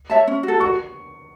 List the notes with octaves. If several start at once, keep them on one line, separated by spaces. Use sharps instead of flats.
C#5 E5 A5
C#4
F#4
A4
F#4 C#6